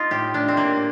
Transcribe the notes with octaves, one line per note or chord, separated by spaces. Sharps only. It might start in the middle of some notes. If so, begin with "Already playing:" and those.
Already playing: D#4 F4
A2 G4
A2 D4
C4
A2 A#3